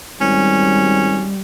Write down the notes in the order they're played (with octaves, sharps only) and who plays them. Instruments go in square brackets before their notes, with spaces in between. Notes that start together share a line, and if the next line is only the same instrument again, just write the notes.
[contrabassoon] G#1 [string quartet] G3 [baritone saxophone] C#4